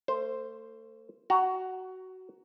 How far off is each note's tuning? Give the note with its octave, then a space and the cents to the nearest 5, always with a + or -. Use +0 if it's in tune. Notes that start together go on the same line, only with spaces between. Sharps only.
A3 +35 C5 +0
F#4 +15 A#5 +0